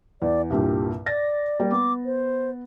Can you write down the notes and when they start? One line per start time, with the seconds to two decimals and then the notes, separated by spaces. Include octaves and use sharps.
0.22 E2 D5
0.50 C2 G2 A#2 G4
1.06 D5 A6 A#6
1.59 G3 A#3 D5
1.71 B3 D6
2.05 C5